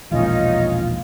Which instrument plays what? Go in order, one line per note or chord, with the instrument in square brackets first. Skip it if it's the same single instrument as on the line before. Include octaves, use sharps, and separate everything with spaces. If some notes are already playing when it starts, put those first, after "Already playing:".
[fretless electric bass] E1 A#1 D#3 [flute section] C#4 D#4 D#5 [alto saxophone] F4